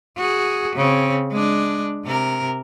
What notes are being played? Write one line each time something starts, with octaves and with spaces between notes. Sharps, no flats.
F#4 G#4
C#3 C4
G#3 D4
C3 A#4